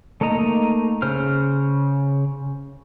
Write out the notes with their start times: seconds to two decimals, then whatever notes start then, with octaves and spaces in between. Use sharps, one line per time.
0.21 A3 A#3 D#4 D#5 A#5
1.02 C#3 C5 F6